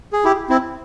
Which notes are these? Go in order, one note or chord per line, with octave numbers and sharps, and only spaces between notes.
G#4
E4 G4
C4 E4